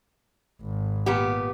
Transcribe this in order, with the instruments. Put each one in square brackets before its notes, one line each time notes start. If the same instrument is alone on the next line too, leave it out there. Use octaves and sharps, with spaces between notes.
[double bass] G#1
[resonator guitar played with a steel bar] A#2 B3 G4